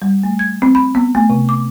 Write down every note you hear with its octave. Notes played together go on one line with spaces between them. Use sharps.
G3
A3
G#6
C4
B5
B3
A3
C3
D6